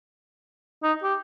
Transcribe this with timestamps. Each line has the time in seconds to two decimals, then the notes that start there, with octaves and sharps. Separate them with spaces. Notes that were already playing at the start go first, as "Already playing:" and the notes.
0.83 D#4
1.03 G4